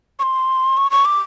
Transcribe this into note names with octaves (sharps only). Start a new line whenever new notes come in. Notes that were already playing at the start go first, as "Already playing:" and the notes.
C#6
C6
C#6
C#6
D6